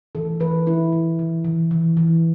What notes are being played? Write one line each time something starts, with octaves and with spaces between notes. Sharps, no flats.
E3 A4
E3 B4
E3 E4
E3
E3
E3
E3
E3